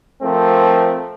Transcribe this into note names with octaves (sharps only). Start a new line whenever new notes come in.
F3 A3 C4 A#4